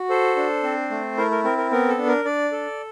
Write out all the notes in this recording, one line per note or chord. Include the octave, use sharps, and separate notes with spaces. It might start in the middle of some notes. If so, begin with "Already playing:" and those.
Already playing: F#4
A4 C5
D4
C4
A3
E4 A#4
A#4
C4 A#4
A#4
B3 A#4
A4
D4
A#4
D4 D5
A4